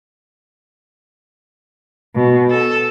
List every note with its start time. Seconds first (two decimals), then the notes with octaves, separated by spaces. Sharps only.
2.15 B2
2.50 A4